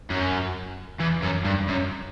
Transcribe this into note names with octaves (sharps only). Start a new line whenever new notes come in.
F#2
E2
F#2
G2
F#2